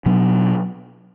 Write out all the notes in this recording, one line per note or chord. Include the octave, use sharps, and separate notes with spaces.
B2 F#3 B3 D4